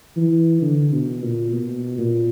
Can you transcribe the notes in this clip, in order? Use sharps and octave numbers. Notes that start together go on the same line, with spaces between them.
E3
D3
B2
A#2
B2
A#2